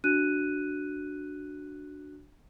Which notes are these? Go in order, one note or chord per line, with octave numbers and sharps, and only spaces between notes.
D4 F#4 F#6 D#7